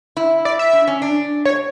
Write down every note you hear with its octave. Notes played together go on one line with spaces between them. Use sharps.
E4
D5
E5
D4
C#4
D4
C#5